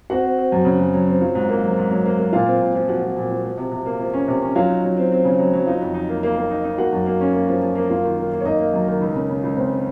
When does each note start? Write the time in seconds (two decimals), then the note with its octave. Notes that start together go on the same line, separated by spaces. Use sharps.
0.10 C4 F#4 F#5
0.24 C4
0.38 C4
0.52 F#2
0.65 C#3
0.79 F#2
0.94 F#3
1.08 C4
1.21 F#3 F4 F5
1.35 G#2
1.49 A#3
1.64 F#3
1.78 G#2
1.91 F#3
2.05 A#3
2.19 A#3
2.33 A#2 F4 F5
2.46 C4
2.60 A#2
2.75 F3
2.88 F3 F#4 F#5
3.03 F3
3.16 A#2
3.30 F3
3.45 F3
3.57 C3
3.71 C3
3.86 A#3
4.00 F3
4.13 C#4
4.28 C3
4.42 C#4
4.56 F#3 F4 F5
4.69 D#4
4.84 F#3
4.97 C4
5.12 C4
5.25 C#3
5.39 F#3
5.54 F#3
5.67 D#4 F4 F5
5.81 F2
5.94 D#4
6.09 A#3
6.23 A#3
6.37 A#3
6.51 D#4
6.64 D#4
6.78 A#3 F#4 F#5
6.93 F#2
7.06 A#3
7.21 C#4
7.34 A#3
7.48 F3
7.62 F3
7.75 A#3
7.89 F#2 F4 F5
8.04 D#3
8.18 D#3
8.32 A#3
8.41 C#5
8.45 A#3 D#4 D#5
8.59 A#3
8.74 F#2
8.88 D#3
9.01 C#2
9.15 C#3
9.29 C#3
9.43 C#2
9.57 C#3 C4 C5